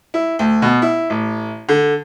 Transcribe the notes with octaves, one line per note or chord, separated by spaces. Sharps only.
E4
D2
B2
E4
A1
D3